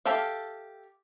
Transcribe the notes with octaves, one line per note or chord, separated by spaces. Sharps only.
G4 A4 E5 F5